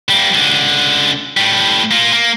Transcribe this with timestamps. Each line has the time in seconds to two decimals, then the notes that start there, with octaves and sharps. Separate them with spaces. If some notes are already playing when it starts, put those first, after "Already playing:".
0.10 G3 A#3
0.34 C#2 D3
1.37 A2 G3
1.91 A#3 F4
2.12 A#3